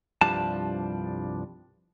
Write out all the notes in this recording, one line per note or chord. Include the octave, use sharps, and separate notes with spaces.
C2 G2 F3 G3 D4 A5